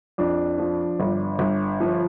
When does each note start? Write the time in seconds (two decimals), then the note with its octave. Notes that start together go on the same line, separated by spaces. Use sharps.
0.18 F2 D4
0.58 F3
1.00 G1
1.39 G1
1.80 F3